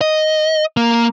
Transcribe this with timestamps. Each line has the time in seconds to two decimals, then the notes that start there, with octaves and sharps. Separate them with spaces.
0.01 D#5
0.77 A#3